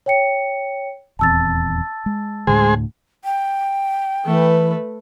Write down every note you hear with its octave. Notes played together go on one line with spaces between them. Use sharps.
C#5 G5 C#7
D#1 E2 C4 A5 E6 A6
G#3
D2 A2 D3 G#3 G#4 C5
G5
E3 A3 B4